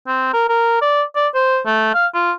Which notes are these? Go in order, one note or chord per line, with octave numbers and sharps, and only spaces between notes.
C4
A#4
A#4
D5
D5
C5
A3
F5
F4